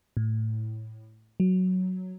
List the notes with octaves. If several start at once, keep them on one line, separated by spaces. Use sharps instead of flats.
A2
F#3